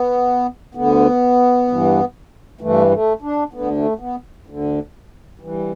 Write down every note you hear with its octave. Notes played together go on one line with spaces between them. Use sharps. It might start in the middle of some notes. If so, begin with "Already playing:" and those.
Already playing: B3
D2 D3 B3
G2 E3
G2 E3 A3
A3
D4
D2 D3 B3
A3
B3
D2 D3
G2 E3